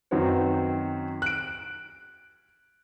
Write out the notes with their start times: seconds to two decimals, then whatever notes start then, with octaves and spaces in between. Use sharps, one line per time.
0.11 F#2 D#3 C4 F#4 B4 C#5
1.22 F#6 D7